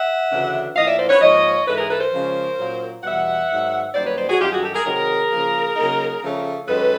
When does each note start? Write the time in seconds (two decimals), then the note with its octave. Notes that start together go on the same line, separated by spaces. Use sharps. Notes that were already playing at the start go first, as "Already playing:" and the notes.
Already playing: E5 F#5
0.31 D2 C#3 E3 A3 D4
0.75 A2 F3 A#3 D4 D#5 F5
0.88 D5 E5
0.99 C5 D5
1.09 B4 C#5
1.21 G#2 F3 A#3 C#5 D#5
1.66 G#2 E3 G#3 A4 B4
1.78 G#4 A#4
1.90 A4 B4
2.01 A#4 C5
2.12 C#3 F3 G#3 C#4
2.58 A#2 F#3 A#3 C#4
3.03 E2 B2 G3 E5 F#5
3.50 G#2 D#3 F#3
3.94 F#2 D#3 G3 A#3 C5 D5
4.06 B4 C#5
4.17 C5 D5
4.29 F#4 G#4
4.39 F#2 D#3 G3 F4 G4
4.52 F#4 G#4
4.63 G4 A4
4.74 G#4 A#4
4.85 C3 D#3 F#3 G#4 A#4
5.32 C#3 F3 A#3
5.76 C#3 F#3 A#3 D#4
6.22 C#3 F3 A3 C#4
6.68 F#2 D#3 G#3 C#4 A4 B4